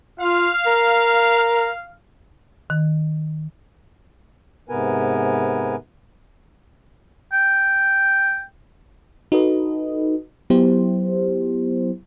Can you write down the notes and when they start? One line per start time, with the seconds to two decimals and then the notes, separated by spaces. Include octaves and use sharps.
0.20 F4 F5
0.66 A#4
2.70 D#3
4.69 G#2 C3 B3 A#4 B4 G#5
7.33 G5
9.32 D#4 F#4 A4 B4 D#5
10.50 F#3 B3 E4 G4 C5